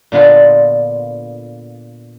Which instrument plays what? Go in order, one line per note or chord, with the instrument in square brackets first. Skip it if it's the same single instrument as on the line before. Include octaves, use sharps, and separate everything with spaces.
[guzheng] A#2 D3 B3 F4